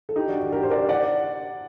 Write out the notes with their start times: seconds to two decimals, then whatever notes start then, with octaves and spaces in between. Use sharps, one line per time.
0.09 A4
0.16 D#4 G4
0.28 D4 F#4
0.41 D4
0.52 G4 A#4
0.63 C5
0.70 A#4 D5
0.89 D5 F#5